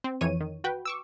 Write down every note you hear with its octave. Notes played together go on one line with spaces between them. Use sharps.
C4
F2 E3 C#5 D#7
D#3
F#4 B4 G5
C#6 D6 E6